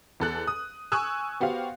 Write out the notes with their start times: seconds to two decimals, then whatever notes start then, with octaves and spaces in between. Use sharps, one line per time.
0.20 E2 A4 F#6
0.47 D#6
0.92 G#5 C#6 D#6 E6 F#6
1.40 B3 F#4 G4 C5 F5